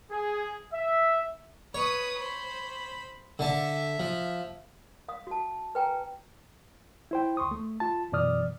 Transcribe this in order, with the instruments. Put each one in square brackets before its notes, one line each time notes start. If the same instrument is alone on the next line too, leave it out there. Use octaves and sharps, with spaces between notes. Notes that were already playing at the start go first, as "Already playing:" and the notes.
[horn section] G#4
E5
[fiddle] B4 D#6 [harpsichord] C#5
[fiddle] C5 B5
[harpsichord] D3 A5 [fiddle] E5
[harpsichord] F3
[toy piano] F5 D#6
F#4 A5
B4 G5 G#5 A#5
[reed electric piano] E4 C5 G5
D2 C6 C#6 D#6
A3
F4 A5
F#2 B2 E3 D5 D#6 F6